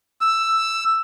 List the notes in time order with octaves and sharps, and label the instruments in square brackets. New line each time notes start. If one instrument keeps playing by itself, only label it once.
[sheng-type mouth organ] E6